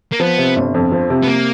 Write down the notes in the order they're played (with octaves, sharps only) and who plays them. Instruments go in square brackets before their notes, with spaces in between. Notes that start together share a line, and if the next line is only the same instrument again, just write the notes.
[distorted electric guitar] A#3
[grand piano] F3 [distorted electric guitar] B3
[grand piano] C3
G1
F2
F3
C3
[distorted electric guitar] B3
A#3